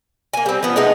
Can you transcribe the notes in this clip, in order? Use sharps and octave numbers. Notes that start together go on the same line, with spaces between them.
A#3 G#5
G3 C4
F3 B3
G#3 A3 B3 D#4